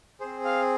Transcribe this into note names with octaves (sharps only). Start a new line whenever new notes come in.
C4 G#4 C5
F5